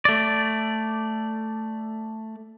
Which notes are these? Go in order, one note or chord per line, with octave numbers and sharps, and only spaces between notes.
A3 D5